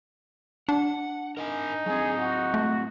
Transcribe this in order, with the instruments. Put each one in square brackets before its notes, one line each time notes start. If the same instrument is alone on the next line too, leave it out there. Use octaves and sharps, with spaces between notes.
[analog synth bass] D4 [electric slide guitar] F#5
[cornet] D#4 [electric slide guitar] A#4 D#5 G#5
[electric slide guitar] F#3 C4 [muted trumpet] G#4
[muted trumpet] F#4
[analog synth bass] A3